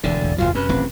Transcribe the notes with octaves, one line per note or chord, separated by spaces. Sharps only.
E1 D2 D3 E3 D5
A1 E2
F#1 B1 F#3 F4
F#1 F#2 C3 C#4 B4
D#1 A1 C4